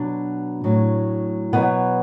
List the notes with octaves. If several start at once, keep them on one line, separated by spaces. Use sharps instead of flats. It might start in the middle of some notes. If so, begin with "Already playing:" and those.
Already playing: B2 F#3 D4
A2 F#3
B2 F#3 B3